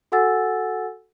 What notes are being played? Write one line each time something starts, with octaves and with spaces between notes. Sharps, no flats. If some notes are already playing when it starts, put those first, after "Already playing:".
F#4 A4 F#5 G#5 E6 A6